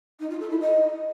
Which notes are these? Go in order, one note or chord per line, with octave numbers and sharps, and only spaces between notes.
D#4
F4
A4
E4
D#5